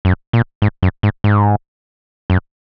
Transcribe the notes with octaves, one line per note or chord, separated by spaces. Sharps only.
F#2
A#2
G#2
F#2
G#2
G#2
F#2